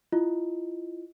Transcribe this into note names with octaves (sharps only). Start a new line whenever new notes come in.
E4 F4 D#5